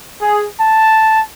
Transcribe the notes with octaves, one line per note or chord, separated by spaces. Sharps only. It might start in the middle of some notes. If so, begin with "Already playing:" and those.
G#4
A5